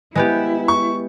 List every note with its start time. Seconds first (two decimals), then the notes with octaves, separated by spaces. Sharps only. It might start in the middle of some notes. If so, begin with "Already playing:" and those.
0.15 G#3 B3 E4 G4
0.68 C#6